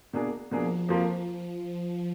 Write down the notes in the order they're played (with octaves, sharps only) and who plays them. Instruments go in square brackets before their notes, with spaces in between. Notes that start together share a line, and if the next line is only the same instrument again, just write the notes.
[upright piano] B2 A#3 D4 G#4
[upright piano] B2 A#3 D4 G#4 [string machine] F3
[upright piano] F2 F3 A#3 F4